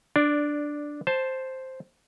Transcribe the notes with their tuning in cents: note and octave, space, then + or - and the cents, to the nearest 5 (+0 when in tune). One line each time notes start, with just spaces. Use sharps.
D4 +0 D5 -10
C5 +0 A5 +0